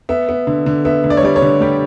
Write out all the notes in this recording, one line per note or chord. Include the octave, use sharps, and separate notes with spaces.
B3 E5
B3
D3
D3
B3 E5
D3
D5
C#5
G3 D5
C#5
D3
G3 G4